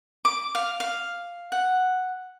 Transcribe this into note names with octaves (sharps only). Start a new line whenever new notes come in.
D6
F5
F5
F#5